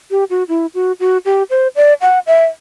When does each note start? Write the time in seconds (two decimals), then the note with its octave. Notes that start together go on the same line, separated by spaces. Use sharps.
0.11 G4
0.30 F#4
0.49 E4
0.75 F#4
1.00 F#4
1.25 G4
1.50 C5
1.76 D5
2.01 F#5
2.27 E5